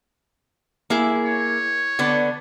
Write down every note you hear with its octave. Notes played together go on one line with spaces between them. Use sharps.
A#3 E4 G#4
C#5
D3 B3 D4